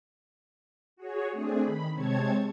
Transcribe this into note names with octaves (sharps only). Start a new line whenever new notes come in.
F#4 G#4 C#5
A3 C4 D4 G#4
D#3 B5
C3 G#3 C4 C#5 A5 G#6